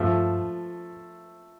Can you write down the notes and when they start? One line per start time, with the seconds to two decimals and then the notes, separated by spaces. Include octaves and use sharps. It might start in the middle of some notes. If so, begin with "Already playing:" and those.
Already playing: G2 F3 A3